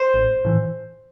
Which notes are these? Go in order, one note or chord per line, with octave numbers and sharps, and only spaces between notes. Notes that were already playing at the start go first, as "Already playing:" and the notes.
Already playing: C5
A1
A2 E3